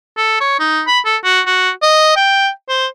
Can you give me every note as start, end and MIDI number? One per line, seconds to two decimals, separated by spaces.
0.17 0.36 69
0.41 0.57 73
0.59 0.82 63
0.87 0.99 83
1.05 1.17 69
1.24 1.41 66
1.47 1.70 66
1.82 2.11 75
2.16 2.49 79
2.69 2.86 72